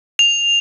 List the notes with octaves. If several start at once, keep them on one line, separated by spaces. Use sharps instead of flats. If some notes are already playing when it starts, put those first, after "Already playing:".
F7